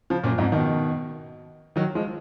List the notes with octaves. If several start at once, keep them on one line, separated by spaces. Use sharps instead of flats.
C#3 F3
F#2 A#2
F2 G#2
B2 D#3
D#3 F#3
F3 G#3